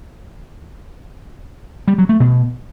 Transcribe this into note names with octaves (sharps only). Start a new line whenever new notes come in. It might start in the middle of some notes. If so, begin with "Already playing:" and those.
G3
F#3
A3
B2